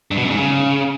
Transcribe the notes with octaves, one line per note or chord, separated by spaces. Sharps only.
G2
B2
F#2
G#2
C#3